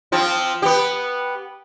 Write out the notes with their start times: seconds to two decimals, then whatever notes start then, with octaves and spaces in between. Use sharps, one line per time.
0.12 F3 C4 F4
0.62 B3 G4